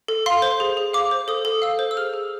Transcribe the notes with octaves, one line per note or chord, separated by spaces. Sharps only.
A4
F5 C6
C5
G#4
G#4
F5 D6
C5
A4 D#6
A4
F5 E6
C5
E6
G#4 F6
G#4